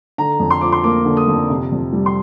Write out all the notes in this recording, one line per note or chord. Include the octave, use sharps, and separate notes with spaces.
D3 A#5
F2
C6
F3 D6
C6
A#3 D6
D3
D#6
F2
C3
F2
G3
C6